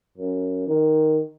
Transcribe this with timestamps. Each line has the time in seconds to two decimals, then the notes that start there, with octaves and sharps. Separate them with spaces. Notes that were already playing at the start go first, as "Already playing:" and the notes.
0.18 F#2
0.67 D#3